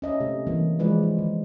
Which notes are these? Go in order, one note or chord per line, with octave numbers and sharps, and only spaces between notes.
C#4 D#5 E5
C3 A3
E3 G3 A#3
E3 F3 G#3 B4 D5
D#4
D#3